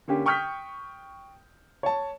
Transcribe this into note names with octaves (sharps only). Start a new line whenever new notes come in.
D3 A#3 C#4 G4
G5 C#6 D#6 F6 G6 B6
C#5 A5